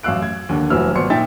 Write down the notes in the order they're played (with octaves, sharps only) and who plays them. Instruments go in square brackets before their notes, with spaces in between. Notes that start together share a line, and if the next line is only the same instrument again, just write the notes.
[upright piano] A1 F#2 F5 E6 F#6 D7
G#6
D#2 D3
F1 A#1 E3 F#3 E6 F6
G#1 B3 D5 C6 C#7
A#2 D#4 E5 G5 A6